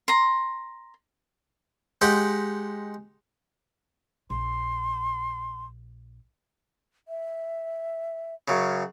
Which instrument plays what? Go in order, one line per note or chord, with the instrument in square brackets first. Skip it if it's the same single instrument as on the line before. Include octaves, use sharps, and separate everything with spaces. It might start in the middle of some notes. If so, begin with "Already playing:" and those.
[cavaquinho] A#5 C6
[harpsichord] G#3 D#4 G4 C5 F#5
[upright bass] A#1 [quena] C6
[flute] E5
[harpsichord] F#2 C#3